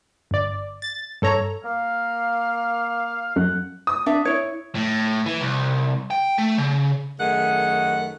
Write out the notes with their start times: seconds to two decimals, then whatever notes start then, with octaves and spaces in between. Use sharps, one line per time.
0.31 G1 D5
0.82 A6
1.22 G2 A4 C#5 A#5
1.65 A#3 F5
3.36 F#2 F#5
3.87 D#6
4.06 D4 D5 E5
4.25 E4 C#5
4.75 A2
5.26 E3
5.41 C2
6.11 G5
6.38 A3
6.58 C#3
7.19 F#2 D#3 A3 G#4 F#5